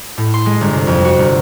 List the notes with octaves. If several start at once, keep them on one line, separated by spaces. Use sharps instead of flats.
A2
C6
G#3
G1
C3
F2
F#4
G1